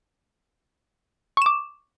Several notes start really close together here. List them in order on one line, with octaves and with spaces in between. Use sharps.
C#6 E7 D6